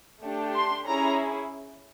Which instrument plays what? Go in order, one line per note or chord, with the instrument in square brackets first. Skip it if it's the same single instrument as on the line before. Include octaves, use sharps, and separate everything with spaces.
[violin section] A3 D4 G4
C6
C#4 E4 G#4 A#5